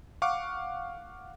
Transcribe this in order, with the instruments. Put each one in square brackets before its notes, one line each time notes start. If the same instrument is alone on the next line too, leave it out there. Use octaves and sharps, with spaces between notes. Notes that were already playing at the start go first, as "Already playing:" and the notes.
[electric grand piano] F5 F#5 C#6 D6